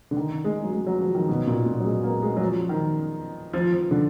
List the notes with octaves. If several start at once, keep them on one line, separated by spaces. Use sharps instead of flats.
D3
D#3
G#3
F#3
G#3
F#3
F3
D#3
B2
A#2
A#2
F#3
G#3
A#3
G#3
F#3
F3
D#3
F3
F3
D3